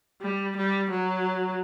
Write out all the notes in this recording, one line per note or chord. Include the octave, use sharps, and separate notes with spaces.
G3
G3
F#3